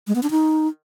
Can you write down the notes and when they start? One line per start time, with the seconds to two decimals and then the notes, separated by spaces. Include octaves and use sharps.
0.08 G#3
0.15 B3
0.23 D4
0.31 D#4